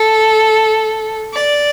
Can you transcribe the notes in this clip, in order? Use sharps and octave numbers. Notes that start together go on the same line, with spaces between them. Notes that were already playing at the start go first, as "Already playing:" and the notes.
Already playing: A4
D5